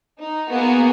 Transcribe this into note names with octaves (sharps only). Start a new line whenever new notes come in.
D#4
A#3 B3 F#4 G#4